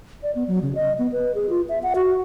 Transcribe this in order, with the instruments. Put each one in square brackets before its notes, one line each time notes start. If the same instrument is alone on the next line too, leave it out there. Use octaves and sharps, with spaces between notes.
[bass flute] D5
B3
F#3
C#3
D#5
B3
B4
G#4
F4
E5
F#5
F#4